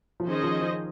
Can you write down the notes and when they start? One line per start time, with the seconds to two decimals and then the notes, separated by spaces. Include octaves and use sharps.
0.20 F3
0.27 D#3 C#4 G#4 C5 D#5
0.44 F3
0.61 F3